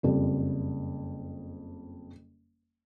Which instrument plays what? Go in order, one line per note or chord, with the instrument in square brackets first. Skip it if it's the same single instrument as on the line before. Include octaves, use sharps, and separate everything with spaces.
[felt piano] F#1 F2 G3